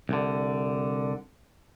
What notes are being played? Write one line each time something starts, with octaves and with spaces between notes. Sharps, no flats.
C2 D3